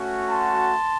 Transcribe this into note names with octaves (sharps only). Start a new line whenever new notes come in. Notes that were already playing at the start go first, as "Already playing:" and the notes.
Already playing: A3 C#4 F#4
A5 C6